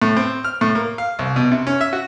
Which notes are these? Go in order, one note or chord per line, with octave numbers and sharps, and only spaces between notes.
A2
C4
F6
A2
A#3
F5
C2
B2
C3
C#4
E5
F#4